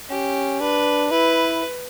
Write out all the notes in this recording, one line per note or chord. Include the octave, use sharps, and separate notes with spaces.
C#4 G4
D4 B4
E4 B4